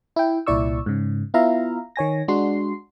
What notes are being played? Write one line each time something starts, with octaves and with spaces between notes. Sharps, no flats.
E4 G5
C2 A#2 E4 D5 C#6 E6
G#2 C#3
B3 E4 F4 E5 F5 A#5
D#3 C#5 G#5 A#6
G#3 D4 F#4 C6 C7